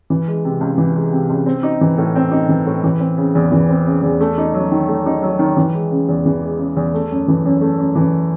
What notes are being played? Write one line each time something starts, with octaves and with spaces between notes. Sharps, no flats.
E3
G#3
C3
C#2
E3
G#3
C3
C#2
C4
D#4
E3
A2
C4
D#4
E3
A2
E3
C4
C#3
E2
E3
C4
C#3
E2
A3
D#4
F#3
D#3
A3
D#4
F#3
D#3
E3
G#3
C#3
E2
E3
G#3
C#3
E2
A3
F#2
E3
F#2
A3
F#2
E3